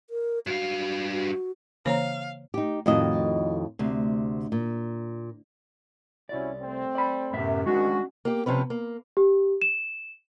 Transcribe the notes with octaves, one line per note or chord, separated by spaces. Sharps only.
A#4
G2 F#4 F5
F#4
C#3 E3 A#3 C5 C#5 F5 A#5
D#4 G4
F2 A2 D#3 F#4 D#5
D2 C3
A#2
C2 C#4 E4 F#4 D5
A3 C4
D5 B5
F#2 A2 C3 B3 E5
D2 G#2 D#3 G#3 C#4 D4 F#4
A#3 G4
C3 F3 C#4 B4
A#3
G4
E7